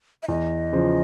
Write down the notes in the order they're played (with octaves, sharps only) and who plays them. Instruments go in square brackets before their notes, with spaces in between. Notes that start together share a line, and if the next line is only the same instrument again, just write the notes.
[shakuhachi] E5
[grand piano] E2 [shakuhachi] D#5
[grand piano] C#3 F3